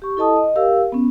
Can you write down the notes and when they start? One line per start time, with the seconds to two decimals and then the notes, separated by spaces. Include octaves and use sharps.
0.02 G4 C#6
0.17 E4 A4 D#5 A5 D#6
0.36 D#5
0.56 G4 A#4 F5 E6
0.92 B3 C#4